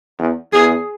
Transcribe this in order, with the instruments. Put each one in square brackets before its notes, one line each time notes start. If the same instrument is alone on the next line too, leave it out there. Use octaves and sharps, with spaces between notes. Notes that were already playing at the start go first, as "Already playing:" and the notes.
[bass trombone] E2
[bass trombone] E2 [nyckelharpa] G#4